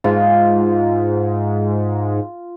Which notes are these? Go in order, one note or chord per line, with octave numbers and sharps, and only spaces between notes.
G#2 F4